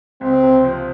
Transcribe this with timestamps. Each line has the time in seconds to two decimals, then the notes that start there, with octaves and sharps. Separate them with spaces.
0.21 C#2 C4
0.43 C3
0.64 F3